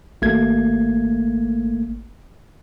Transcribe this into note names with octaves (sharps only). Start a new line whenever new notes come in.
G#1 A3 A#3 G#6